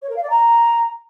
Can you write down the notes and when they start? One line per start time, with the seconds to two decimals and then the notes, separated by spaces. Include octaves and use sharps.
0.02 C#5
0.09 A#4
0.16 F5
0.23 D5
0.30 A#5